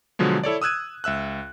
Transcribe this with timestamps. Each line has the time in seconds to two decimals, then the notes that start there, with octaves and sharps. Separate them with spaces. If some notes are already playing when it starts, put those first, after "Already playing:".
0.19 B2 D3 F3 F#3 G#3
0.44 E4 A4 C#5 D5
0.62 D#6 E6 F#6 G#6 D#7
1.04 C#2 E5 E6 F#6